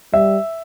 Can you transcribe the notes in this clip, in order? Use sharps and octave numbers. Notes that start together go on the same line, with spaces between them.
G3 E5